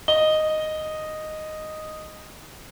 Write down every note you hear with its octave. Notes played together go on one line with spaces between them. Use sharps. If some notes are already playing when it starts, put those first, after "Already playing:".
D#5 G7